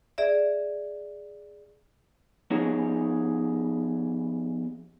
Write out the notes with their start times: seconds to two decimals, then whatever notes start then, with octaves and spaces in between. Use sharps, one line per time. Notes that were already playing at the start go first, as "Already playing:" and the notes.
0.18 G#4 D5 E5
2.51 F3 B3 D#4 G4 G#4 C#5